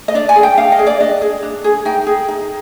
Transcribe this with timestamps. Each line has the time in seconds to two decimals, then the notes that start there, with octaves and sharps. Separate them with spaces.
0.08 D#5
0.14 D4 D5
0.29 G#5
0.36 G#4
0.43 G5
0.58 D4 F5
0.72 D#5
0.79 G#4
0.86 D5
1.00 D4 D#5
1.22 G#4
1.43 D4
1.64 G#4
1.85 D#4 G5
2.07 G#4
2.28 D#4